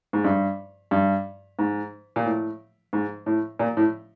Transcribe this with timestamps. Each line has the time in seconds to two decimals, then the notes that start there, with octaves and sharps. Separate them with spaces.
0.13 G#2
0.24 G2
0.91 G2
1.59 G#2
2.16 A#2
2.26 A2
2.93 G#2
3.26 A2
3.59 A#2
3.77 A2